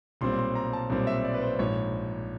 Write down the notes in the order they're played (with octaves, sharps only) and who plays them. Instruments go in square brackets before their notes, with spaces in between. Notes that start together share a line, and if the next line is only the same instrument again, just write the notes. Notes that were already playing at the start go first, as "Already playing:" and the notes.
[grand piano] B1 A#2 G3 C4 C6
C6
A#5
A5
B1 A#2 G3 C4
E5
D5
B4
C5
A#1 G#2 F3 C#5